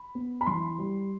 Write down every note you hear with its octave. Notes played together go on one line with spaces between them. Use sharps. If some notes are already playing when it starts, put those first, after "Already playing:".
Already playing: B5
B3
B5
E3 C6
G3